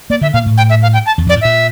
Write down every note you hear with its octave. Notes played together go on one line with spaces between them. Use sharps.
A#3 D5
D3 E5
A#2 F5
A2
G5
E5
F5
G5
A5
E2
F2
D5
A2
A#2 E5